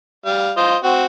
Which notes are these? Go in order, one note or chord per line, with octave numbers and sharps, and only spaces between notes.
G3 F5
F4 C5 D#5
C4 F#4